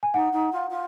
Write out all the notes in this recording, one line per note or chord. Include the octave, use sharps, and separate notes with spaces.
G#5
D#4 F#5
D#4
F4
F4